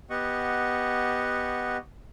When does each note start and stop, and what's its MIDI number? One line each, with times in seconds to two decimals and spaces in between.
0.10 1.77 59
0.10 1.77 67
0.10 1.77 75
0.10 1.77 78
0.10 1.77 85